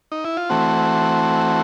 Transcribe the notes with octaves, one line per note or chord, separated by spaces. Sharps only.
D#4
E4
F4
E3 A3 C4 F#4